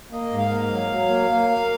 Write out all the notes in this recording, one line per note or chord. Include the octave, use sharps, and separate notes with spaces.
A#3 D#5
G#2
F5
A#3
F5
F#3
F#3
A#3
A#3
A#3